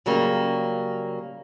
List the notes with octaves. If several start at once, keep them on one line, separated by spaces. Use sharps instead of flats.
C#3 F#3 G3 A#3